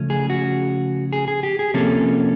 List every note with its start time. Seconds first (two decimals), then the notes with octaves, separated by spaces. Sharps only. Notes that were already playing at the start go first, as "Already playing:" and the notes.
Already playing: C#3 F3 A3 C#4
0.10 G#4
0.30 F#4
1.13 G#4
1.28 G#4
1.43 G4
1.59 G#4
1.74 C3 F3 A#3 C#4 A4